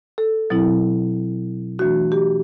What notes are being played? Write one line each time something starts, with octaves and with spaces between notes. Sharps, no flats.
A4
B2 F#3 C4 E4
E3 A3 D4 F#4
G4